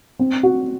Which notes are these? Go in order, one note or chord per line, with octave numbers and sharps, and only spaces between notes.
C4
F#4